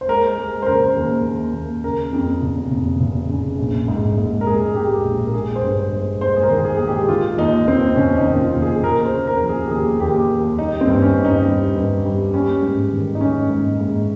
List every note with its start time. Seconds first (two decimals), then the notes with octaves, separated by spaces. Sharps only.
0.01 C5
0.08 G#3 A#4
0.38 G#3
0.62 C5
0.67 C#3 A#4
0.96 D#2
1.26 D#2
1.54 D#2
1.84 C#3 A#4
2.13 F2
2.42 F1
2.71 F1
3.01 F1
3.29 C#3
3.58 A#1
3.88 G#2
4.18 G#2
4.41 A#4
4.46 G#3 G#4
4.75 G#3 G4
5.04 A#1
5.26 A#4
5.33 G#3 G#4
5.56 C5
5.63 G2
5.77 C5
5.92 G#3
6.21 G#3 C5
6.36 G#4
6.43 A#4
6.50 D#3
6.65 G#4
6.77 G#3 G#4
6.87 G4
7.09 D#3 F4
7.37 D#2 D#4
7.67 D#2 C4
7.96 F1 C#4
8.18 D#4
8.26 D#3
8.40 F4
8.55 D#2
8.62 G#4
8.75 G#4
8.84 D#2 A#4
9.05 C5
9.13 C#3
9.27 A#4
9.42 F3
9.49 G#4
9.65 G4
9.71 D#2 G#4
10.00 D#2 G4
10.29 D#2
10.59 G3 D#4
10.81 C4
10.88 G2
11.02 C#4
11.18 G2
11.25 D#4
11.47 G3
11.76 G2
12.05 G3
12.34 G3 C#4
12.62 G#2
12.93 D#3
13.15 D#4
13.21 G#2 C#4
13.50 G#2
13.80 G#2